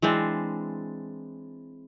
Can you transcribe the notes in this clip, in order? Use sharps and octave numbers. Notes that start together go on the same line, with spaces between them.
E3 G#3 C4 D4